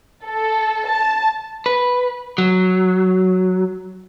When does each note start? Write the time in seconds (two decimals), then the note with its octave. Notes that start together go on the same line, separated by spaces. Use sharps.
0.25 A4
0.87 A5
1.66 B4
2.38 F#3